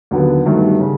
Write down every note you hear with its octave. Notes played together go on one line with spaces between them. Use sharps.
D#2 D3 F#3 B3
G1 G2 D#3 F#3 A3
C#3